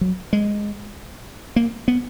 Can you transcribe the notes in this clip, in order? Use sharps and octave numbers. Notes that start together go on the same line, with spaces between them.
F#3
G#3
A#3
B3